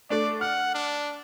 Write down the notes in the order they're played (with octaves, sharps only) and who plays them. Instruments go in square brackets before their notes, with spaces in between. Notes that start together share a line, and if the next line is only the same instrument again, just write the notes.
[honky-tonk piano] A3 D4 [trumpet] D5
[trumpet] F#5 [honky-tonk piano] F6
[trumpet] D4